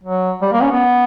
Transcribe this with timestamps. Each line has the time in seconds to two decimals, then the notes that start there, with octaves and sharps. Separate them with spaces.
0.03 F#3
0.42 G3
0.52 A#3
0.62 C#4
0.71 B3